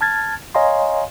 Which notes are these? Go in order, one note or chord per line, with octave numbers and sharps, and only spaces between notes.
A5 F6 G#6 A6
C#5 D#5 F5 G#5 A#5 C6